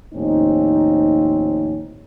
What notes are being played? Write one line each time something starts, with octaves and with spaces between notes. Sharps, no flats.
D#2 A2 F3 C4 C#4 D#4